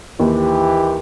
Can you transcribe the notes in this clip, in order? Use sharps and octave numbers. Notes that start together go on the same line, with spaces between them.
D#2 E3 G4